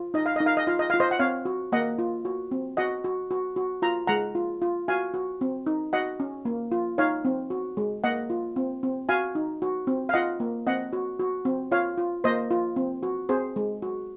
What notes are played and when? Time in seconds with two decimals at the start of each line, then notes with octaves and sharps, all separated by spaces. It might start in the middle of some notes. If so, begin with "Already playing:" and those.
Already playing: F4
0.14 D#4 D#5
0.26 F5
0.36 D#4 D#5
0.46 F5
0.57 D#5
0.67 F4 F5
0.79 D#5
0.90 F4 F5
1.00 C5 D#5
1.11 F#5
1.19 C4 C#5 F5
1.45 F#4
1.72 A#3 D#5 F#5
1.99 F4
2.25 F#4
2.51 C4
2.77 F#4 D#5 F#5
3.04 F#4
3.31 F#4
3.56 F#4
3.82 F4 A#5
4.07 G#3 F#5 A#5
4.35 F4
4.62 F4
4.88 F#4 F5 G#5
5.14 F#4
5.41 C4
5.66 D#4
5.93 F#4 D#5 F#5
6.20 C#4
6.45 A#3
6.72 F4
6.98 D#4 C#5 F5
7.25 C4
7.50 F#4
7.77 G#3
8.04 A#3 D#5 F#5
8.30 F4
8.56 C4
8.83 C4
9.09 F#4 F5 G#5
9.35 D#4
9.62 F#4
9.87 C4
10.09 F5
10.14 F4 D#5 F#5
10.40 A#3
10.67 C4 D#5 F#5
10.93 F#4
11.20 F#4
11.45 C4
11.71 F4 C#5 F5
11.97 F4
12.24 A#3 C5 D#5
12.51 F4
12.76 C4
13.03 F#4
13.29 C4 G#4 C5
13.56 G#3
13.82 F#4